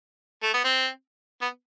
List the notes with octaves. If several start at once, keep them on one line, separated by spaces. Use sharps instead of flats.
A3
B3
C4
B3